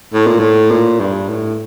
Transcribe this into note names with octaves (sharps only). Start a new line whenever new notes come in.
A2
A#2
A2
A#2
G2
A2